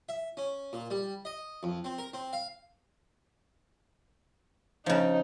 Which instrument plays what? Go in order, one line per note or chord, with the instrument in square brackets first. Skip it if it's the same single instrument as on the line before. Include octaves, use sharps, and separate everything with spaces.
[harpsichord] E5
C#4
A#2
G3
D#5
F2
C4
A#4
C4
F5
[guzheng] C#3 F3 [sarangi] D#4